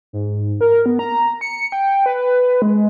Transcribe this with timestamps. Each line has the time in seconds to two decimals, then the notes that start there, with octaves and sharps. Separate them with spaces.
0.13 G#2
0.61 A#4
0.86 B3
0.99 A#5
1.41 C#7
1.72 G5
2.06 B4
2.62 G#3